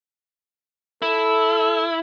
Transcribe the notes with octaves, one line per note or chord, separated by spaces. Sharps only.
E4 A4